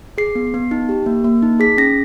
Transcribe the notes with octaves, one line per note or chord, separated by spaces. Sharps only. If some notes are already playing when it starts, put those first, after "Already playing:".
G#4 C7
B3
B3
D#4
G4
A#3
A#3
D#4
G#4 B6
C#4 A#6